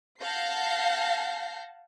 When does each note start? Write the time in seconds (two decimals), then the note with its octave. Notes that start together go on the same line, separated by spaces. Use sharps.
0.21 F5 F#5 A5 G6 A#6 C7